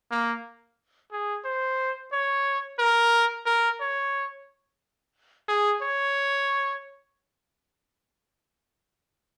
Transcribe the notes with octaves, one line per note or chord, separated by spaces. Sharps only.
A#3
G#4
C5
C#5
A#4
A#4
C#5
G#4
C#5